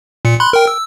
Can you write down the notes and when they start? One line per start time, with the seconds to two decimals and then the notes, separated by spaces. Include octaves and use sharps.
0.25 A#2 C#7
0.40 B5 C6 F#6
0.53 A#4 G5
0.67 E6